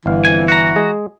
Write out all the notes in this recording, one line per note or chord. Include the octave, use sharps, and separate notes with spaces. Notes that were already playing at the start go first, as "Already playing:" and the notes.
G1 E3 F5
F2 G#5
F#4 A#5
G#3 G#4